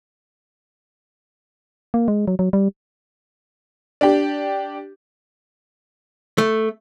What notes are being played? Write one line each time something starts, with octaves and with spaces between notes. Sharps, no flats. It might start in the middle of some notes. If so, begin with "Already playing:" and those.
A#3
G#3
F#3
F#3
G3
D4 G4
A3